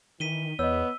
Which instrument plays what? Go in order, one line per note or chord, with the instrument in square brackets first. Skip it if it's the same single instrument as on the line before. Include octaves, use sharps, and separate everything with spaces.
[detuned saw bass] D#3 [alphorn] E3 [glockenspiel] B6 D#7 G7
[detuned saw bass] E2 [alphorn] B3 [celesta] C#5 D#5 [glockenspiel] E6